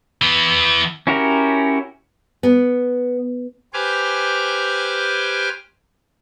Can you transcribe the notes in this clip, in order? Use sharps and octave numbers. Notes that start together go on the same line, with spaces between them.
E3 B3
C#4 E4 F#4 G4 A#4
B3
G4 B4 C5 G#5 D6 F6